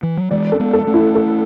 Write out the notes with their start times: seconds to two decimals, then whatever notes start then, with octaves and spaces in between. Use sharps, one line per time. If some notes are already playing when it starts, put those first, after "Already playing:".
0.03 E3
0.17 F#3
0.31 E3 G#3 D5
0.52 C#4 A4
0.60 G#3 B3
0.73 A4
0.87 A3 C#4
0.94 E4
1.15 A4